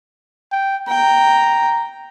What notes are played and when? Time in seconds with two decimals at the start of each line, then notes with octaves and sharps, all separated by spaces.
0.52 G5
0.88 G5 A#5